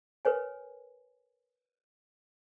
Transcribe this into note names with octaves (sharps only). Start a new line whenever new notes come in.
A#4 B4 C#5 G#5